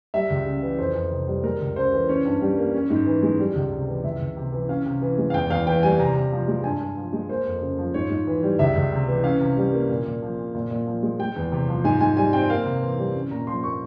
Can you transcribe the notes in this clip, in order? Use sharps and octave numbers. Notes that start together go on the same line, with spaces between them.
G3 E5
C#2
C#3
E3
F2 C5
F2
C3
G3
G#3 A#4
C#2
C#3 C5
E3
C#4 C#5
G2
G3
A#3
C#4
G#2
E3
G#3
G3
C#2
C3
E3
C#2 E5
C#2
C3
E3
C#4 F5
C3
E3
G#3
F5
E2 G5
E2 F5
E3 G5
G3 G#5
C3 A#5
C3
F3
G#3
G2 G#5
G2
F3
G#3
A#3 C5
F2
C#3
F3
G#2 C#5
G#2
E3
G3
C#2 E5
C#2
C3
E3
C#4 F5
C3
G3
A#3
A#2
A#2
F3
C4
A#2
A#2
F3
G#3
G#3 G5
E2
C3
F3
G#2 G#5
G#2 G#5
G3 G#5
C4 G5
A#3 F5
C3
E3
G3
C#4
A#2 A#5
F3 C6
A#3 C#6